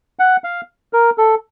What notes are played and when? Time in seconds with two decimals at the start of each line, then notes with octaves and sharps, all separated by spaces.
0.19 F#5
0.44 F5
0.93 A#4
1.18 A4